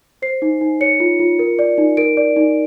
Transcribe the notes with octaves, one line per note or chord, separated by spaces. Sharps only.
C5 C7
D#4
D#4
C#5 C#7
F4
F4
A#4
D5
D#4
A#4 D7
D5
D#4